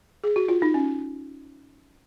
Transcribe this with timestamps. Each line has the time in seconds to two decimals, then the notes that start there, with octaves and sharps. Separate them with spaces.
0.24 G#4
0.36 F#4
0.48 F4
0.62 D#4
0.74 C#4